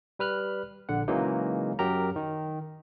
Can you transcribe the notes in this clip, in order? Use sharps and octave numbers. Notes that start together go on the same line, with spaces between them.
G3 B4 F6 F#6
A#1 D3 F#5
C#3 E3 F#3 G#3 A#3 D#4
F#2 F#3 G4 A#4 A#5
D#3